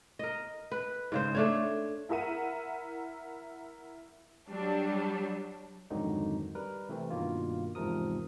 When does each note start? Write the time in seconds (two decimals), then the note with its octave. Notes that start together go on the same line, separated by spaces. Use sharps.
0.19 A#4 D#5
0.72 B4
1.12 G#2 C#3 C5
1.35 A3 D4 C#5
2.09 E4 A#4 E5 F#5 D#7
4.49 F#3 G3 D4
5.90 F2 G#2 D3 D#3 F#3 D#4
6.55 G3 A#4 B4
6.89 C3 E3 A3 C4
7.10 G2 B2 D#3 A#3 F4
7.75 E2 G#2 C3 F3 A#4 D#6